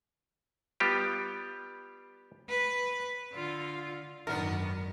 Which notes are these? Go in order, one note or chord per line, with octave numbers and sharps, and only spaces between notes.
G3 B3 F4 G4
B4
D3 F4
G#1 F#2 D#3 B3 D4 A#4